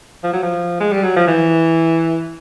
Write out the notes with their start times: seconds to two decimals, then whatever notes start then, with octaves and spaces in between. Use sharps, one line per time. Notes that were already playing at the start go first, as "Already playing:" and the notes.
0.23 F3
0.33 F#3
0.43 F3
0.80 G#3
0.92 G3
1.04 F#3
1.16 F3
1.27 E3